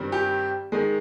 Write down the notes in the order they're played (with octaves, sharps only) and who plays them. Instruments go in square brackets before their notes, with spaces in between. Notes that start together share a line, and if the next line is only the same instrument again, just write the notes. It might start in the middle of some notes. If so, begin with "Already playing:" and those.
Already playing: [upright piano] G2 D#3 G3 C4
G4
D#3 G#3